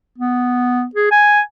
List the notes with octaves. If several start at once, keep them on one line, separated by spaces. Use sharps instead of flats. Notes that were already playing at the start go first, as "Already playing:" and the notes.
B3
G#4
G#5